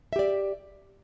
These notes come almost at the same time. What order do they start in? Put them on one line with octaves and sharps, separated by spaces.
E5 G4 D5